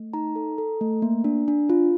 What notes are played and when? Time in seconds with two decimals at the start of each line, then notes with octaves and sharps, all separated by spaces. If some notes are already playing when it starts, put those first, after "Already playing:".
Already playing: A3
0.13 D#4 A#5
0.36 A4
0.58 A4
0.81 A3
1.02 A#3
1.24 D4
1.48 D4
1.70 F4